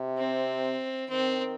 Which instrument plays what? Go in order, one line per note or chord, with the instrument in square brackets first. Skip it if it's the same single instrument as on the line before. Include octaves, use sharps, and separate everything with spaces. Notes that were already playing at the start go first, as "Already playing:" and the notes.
Already playing: [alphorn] C3
[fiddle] C4
[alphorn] D#3 [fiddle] C4